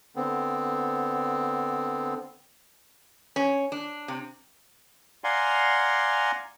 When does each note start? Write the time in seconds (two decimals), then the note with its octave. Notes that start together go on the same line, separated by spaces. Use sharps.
0.16 D3 B3 C4
3.36 C#4
3.72 D4
4.08 C3
5.24 D5 F5 F#5 G#5 A#5 C6